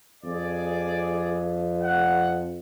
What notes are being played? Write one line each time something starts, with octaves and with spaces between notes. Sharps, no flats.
F2 G#4 D5
F#5